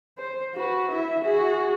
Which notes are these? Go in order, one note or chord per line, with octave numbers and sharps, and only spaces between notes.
C5
F#4 B4
E4 E5
F#4 G#4